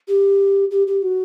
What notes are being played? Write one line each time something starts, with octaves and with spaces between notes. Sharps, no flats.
G4
G4
G4
F#4